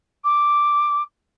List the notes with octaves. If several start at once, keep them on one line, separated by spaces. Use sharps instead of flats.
D6